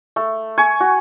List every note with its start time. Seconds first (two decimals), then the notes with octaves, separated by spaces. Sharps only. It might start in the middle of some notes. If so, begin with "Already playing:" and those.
0.16 A3
0.58 G#5 C#6
0.80 F#4